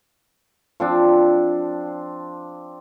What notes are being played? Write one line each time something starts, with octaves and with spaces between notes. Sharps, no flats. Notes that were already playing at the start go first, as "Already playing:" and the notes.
F3 C4 D4